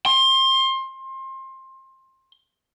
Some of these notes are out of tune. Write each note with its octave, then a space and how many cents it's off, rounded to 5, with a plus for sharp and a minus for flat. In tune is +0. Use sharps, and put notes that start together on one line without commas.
C6 +25